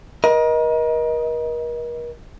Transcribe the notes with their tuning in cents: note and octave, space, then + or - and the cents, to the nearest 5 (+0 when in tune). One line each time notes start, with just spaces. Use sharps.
A#4 +40 D#5 +15